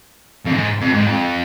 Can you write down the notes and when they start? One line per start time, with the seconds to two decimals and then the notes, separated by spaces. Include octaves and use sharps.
0.46 F2
0.54 G#2
0.82 F2
0.94 G#2
1.08 F2